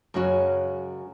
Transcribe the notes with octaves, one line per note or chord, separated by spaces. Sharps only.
F#2 C#3 G#3 C#4 F#4